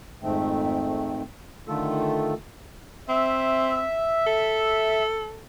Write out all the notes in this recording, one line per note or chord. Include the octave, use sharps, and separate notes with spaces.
F2 G#2 D#3 A3 C4
D3 D#3 A3 F4 A4
C4 E5
A4